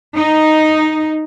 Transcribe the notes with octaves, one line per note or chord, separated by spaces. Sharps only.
D#4